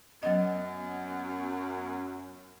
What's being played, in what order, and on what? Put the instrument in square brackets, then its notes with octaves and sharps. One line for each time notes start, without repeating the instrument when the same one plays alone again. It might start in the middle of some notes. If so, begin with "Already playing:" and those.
[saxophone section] F#2 [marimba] F#3 D#5 [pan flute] B3